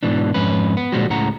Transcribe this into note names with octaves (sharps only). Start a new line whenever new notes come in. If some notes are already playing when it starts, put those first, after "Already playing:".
G#2 B2 E3 D4
F2 G#2 C#4 B4
B3
A#2 D3 F3 G3 G#3 F#4
C#2 A2 C#3 F#5 A#5